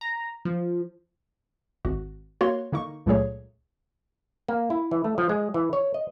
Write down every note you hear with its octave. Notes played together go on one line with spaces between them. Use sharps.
A#5
F3
G#1 F#4
A#3 F#4 C#5 C6
D3 A#3 D#4 C#6
C#2 A#2 F#3 A3 G#4 C#5
A#3
E4
E3
A3
F3
G#3
E3
C#5
D#5